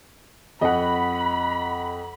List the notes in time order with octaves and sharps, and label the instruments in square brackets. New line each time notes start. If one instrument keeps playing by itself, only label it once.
[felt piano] F2 [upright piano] D#5 F#5 [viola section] B5